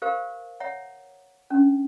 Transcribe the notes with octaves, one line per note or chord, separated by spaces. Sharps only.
G4 A#4 C5 F5
C#5 E5 F#5 A#5
C#4 D4